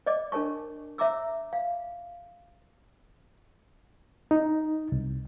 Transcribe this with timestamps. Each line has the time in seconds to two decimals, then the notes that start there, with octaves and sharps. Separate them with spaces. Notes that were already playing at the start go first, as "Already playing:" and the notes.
0.06 D5 D#5 D6
0.32 D4 A#4 C#5 A5 C#6
0.98 C#5 E5 A#5 D6 E6
1.53 F5
4.31 D#4
4.92 C2